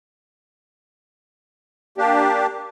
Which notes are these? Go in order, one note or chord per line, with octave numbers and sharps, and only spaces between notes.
A#3 D4 G4